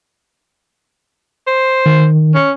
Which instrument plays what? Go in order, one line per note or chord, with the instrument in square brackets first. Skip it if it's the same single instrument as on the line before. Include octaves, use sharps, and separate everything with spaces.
[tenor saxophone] C5
[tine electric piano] D#3
[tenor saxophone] C#4